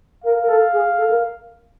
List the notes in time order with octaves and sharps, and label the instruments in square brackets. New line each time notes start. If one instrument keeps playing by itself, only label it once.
[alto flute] A#4 [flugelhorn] F5
[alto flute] A#4
A4
G#4
A4
A#4